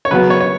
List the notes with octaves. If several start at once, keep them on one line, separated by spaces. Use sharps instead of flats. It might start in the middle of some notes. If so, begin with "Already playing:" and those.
C#5
C#3 F#3 B3 B4
C#5
C#5